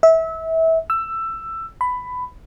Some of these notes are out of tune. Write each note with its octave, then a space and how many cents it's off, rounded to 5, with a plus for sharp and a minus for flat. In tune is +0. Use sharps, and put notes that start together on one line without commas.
E5 -25
E6 +15
B5 +15